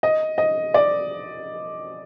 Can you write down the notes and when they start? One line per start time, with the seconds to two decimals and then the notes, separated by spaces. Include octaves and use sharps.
0.03 D#5
0.38 D#5
0.74 D5